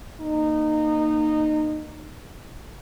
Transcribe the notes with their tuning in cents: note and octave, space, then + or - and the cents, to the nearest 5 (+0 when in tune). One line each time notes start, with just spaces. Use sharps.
A#3 +0 D#4 -20